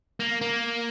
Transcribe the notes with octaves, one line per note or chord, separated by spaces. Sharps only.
A#3
A#3